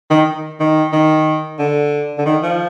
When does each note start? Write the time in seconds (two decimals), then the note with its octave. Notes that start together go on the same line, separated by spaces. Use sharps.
0.11 D#3
0.60 D#3
0.93 D#3
1.59 D3
2.18 D3
2.26 D#3
2.43 F3